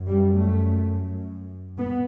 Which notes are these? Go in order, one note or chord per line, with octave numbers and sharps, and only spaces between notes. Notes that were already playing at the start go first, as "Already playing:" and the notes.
Already playing: F#2
G3
A3
B3